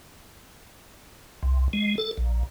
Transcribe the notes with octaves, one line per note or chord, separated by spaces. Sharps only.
C2
G#3
A4
A#1